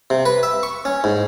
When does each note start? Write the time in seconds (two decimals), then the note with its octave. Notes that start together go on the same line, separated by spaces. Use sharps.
0.10 C3
0.26 B4
0.43 E5
0.63 C#6
0.85 C#4
1.04 G#2